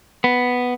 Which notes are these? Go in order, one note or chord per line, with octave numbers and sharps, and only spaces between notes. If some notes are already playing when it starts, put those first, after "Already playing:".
B3